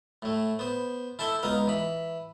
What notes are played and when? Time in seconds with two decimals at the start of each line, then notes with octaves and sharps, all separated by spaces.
0.22 A2 A3
0.59 B3 C5
1.19 E4 A4 E5 G5 C6
1.43 C#2 B3 D#4 F5
1.67 E3 B5